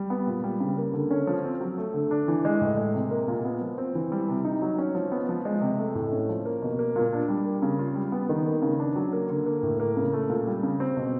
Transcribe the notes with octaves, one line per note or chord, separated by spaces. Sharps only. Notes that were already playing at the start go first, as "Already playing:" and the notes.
Already playing: G3
B3
A#2
G3
C#3
A#3
D3
C#4
F3
C4
F#3
A3
D3
D4
E3
G#3
A2
G#3
C3
A#3
A#2
B3
F3
C4
E3
G3
C3
D#4
F#3
C#4
F3
B3
F3
G#3
C3
A3
A2
C#4
F3
A#3
B2
A#3
A#2
D4
G3
A#3
C#3
F4
G3
B3
D#3
A#3
C#3
D4
F#3
A#3
D3
A#3
A2
A#3
C#3
A3
A#2
G3
C#3
C4
B2